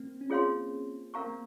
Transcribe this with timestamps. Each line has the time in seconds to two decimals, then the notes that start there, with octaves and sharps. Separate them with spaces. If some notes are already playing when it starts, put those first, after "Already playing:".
Already playing: A#3 C4
0.21 C#4
0.30 C4 F4 G#4 C#5 F5 C6
1.14 C4 A#4 F5 A#5 C#6
1.26 A#3